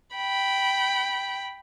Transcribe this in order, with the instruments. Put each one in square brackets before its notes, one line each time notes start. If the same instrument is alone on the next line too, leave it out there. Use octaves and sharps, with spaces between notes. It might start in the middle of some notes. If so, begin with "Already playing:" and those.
[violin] G5 B5